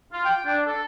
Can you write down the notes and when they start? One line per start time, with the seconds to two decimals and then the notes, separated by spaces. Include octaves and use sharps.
0.12 F4
0.25 G5
0.45 D4
0.65 A4